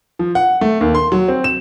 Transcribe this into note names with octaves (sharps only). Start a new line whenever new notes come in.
F3
F#5
A3
D#2
C6
F#3
C4
E7